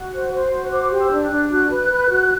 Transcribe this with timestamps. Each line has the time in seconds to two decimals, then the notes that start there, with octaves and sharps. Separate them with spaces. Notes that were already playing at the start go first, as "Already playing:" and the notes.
Already playing: F#4
0.13 C5
0.32 C5
0.52 F#4
0.72 C5 D6
0.91 G4
0.97 E6
1.11 D4
1.24 F#6
1.31 D4
1.50 F#4 F#6
1.70 B4
1.90 B4
2.09 F#4